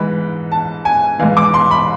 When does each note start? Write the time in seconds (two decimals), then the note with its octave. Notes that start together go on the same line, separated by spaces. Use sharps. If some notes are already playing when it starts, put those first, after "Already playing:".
Already playing: G#2 E3 B5
0.52 A5
0.85 G#5
1.19 G#2 E3 F5
1.37 D6
1.54 C6
1.71 B5